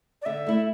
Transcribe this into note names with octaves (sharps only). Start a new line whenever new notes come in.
D5
D3 E5
A3 E4